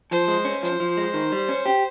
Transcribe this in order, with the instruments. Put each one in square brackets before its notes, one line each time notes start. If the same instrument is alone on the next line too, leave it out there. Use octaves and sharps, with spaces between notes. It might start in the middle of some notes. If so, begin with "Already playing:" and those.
[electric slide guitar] F3 [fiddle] C5
[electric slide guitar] G#3
C#4
[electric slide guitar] F3 [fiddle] C5
[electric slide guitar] F3
G#3
D#3
G3
C#4
G4